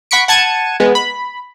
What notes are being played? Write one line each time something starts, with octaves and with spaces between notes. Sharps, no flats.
F#5 B5 C#6 B6 C#7 D7
F#5 A5 G#6 C#7 D#7 E7
G#3 B3
B5